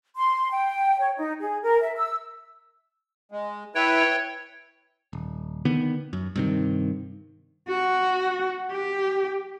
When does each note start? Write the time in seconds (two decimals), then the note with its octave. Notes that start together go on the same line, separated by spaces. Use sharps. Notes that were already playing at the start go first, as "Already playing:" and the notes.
0.16 C6
0.51 G5
0.99 C#5
1.17 D#4
1.40 G#4
1.63 A#4
1.82 E5
1.96 E6
3.32 G#3
3.75 E4 B4 C#5 G5
5.13 D#1
5.65 D3 D#3 B3
6.13 F#2
6.36 G2 C3 D#3
7.68 F#4
8.72 G4